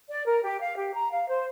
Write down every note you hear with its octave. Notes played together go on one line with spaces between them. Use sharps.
D5
A#4
G4
F5
G4
A#5
F5
C5